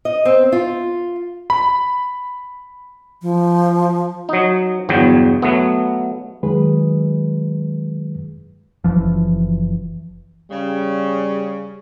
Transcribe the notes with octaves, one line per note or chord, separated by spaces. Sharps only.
D#5
C4
F4
B5
F3
F#3 D#4
G1 E2 F#3 G5
F#3 A3 B3
D#3 F#3 G#3 G#4 B4
F#1 E3 F3
C#3 G3